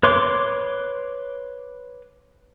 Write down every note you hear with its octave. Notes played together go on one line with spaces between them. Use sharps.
B4 C#5 C6 D6